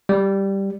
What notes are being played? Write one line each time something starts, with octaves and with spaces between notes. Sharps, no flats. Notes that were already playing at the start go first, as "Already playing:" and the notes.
G3